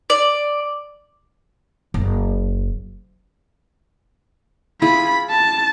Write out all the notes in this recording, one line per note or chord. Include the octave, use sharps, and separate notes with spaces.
D5
F#1
E4 F4 G#4 B5
A5